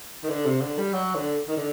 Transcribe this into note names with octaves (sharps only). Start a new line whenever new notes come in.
D#3
D3
C3
D3
G3
F#3
D3
D#3
D3